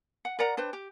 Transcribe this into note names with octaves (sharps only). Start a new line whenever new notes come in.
F#5
A#4 D5 F#5 A#5
D4 B4 C5 G5
G4